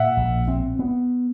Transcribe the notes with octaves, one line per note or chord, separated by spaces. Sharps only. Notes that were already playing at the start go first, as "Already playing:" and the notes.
Already playing: A#2 E5 F#5
A#1
C4
B3